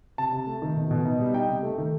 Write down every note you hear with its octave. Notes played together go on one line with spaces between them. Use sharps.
C3 A5
C3
A3
D#3
B2
B2
D#4
G3
D#4 G5
C3
A3
D#3